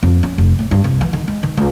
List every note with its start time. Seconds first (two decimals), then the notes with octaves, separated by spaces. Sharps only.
0.03 F2
0.23 C#4
0.38 F1
0.59 A2
0.71 G2
0.84 C2
1.01 E3
1.13 D#3
1.28 G#3
1.43 D#3
1.57 C#2